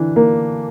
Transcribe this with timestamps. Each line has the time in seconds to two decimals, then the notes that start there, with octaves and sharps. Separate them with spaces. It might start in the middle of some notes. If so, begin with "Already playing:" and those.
Already playing: D3 E3 D4
0.16 A#3